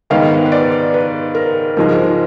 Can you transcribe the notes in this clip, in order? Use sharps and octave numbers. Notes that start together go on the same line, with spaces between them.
G#2 D#3 G#3 B3 F5
B4
D5
B4
A#4
G#2 F3 G#3 A#4